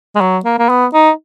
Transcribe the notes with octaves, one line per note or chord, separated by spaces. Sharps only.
G#3
F#3
A#3
A#3
B3
D#4